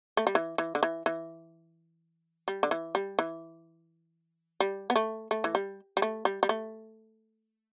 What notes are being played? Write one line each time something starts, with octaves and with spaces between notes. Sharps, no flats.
A3
G3
E3
E3
D3
E3
E3
G3
D3
E3
G3
E3
G3
B3
A3
A3
E3
G3
G3
A3
G3
G3
A3